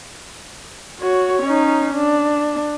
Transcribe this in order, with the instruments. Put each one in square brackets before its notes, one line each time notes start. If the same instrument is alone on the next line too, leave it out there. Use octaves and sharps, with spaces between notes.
[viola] F#4 C#5
C#4 D#4
D4